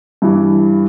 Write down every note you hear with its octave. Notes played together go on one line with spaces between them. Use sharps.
G2 E3